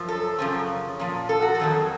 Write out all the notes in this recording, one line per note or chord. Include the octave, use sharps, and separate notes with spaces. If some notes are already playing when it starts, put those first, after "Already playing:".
Already playing: F#2 F3
A4
F#2 C#3 F3
A#2 F3
A4
F#4
A4
F2 D#3 F#3